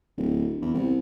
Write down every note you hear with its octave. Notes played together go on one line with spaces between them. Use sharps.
D1
E2
C2